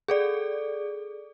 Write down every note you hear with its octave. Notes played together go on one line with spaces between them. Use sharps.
G#4 A4 D5